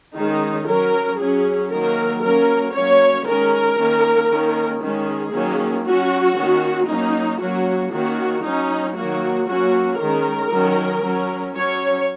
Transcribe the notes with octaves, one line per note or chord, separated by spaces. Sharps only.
D#3 G#3 C#4 D#4
F#3 C#4 A#4
F#3 C#4 G#4
D#3 F#3 A#3 A#4
F#3 A#3 C#4 A#4
F#3 A#3 C#4 C#5
D#3 G#3 C#4 A#4
D#3 A#3 C#4
D#3 A#3 C#4
D#3 G#3 C#4 G#4
D#3 F#3 A#3 C#4
F#3 C#4 F#4
D#3 A#3 C#4
F#3 A#3 C#4 D#4
F#3 A#3 C#4 F#4
D#3 A#3 C#4 F#4
F#3 C#4 D#4
D#3 F#3 A#3 F#4
F#3 A#3 C#4 F#4
D#3 G#3 C#4 A#4
D#3 F#3 C#4
F#3 C#4
F#3 C#4 C#5